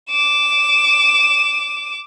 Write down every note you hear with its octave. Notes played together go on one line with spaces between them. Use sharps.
D6 E7